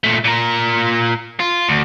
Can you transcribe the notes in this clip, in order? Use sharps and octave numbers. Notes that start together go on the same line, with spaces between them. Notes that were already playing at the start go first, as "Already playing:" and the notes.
A#2 A3
A#2 A#4
F4
D2